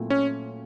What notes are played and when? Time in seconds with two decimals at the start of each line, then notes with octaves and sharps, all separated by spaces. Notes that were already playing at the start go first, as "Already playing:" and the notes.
Already playing: A#2 F#3 A3 C4 E4
0.10 C#4